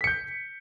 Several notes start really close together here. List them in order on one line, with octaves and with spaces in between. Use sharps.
B6 C#7 G6